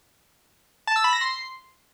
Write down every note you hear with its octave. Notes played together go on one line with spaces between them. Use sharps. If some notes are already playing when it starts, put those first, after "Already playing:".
A5
E6
B5
A#6
C6